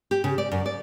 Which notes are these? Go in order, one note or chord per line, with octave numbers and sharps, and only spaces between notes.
G4
C#3
D5
F#2
D5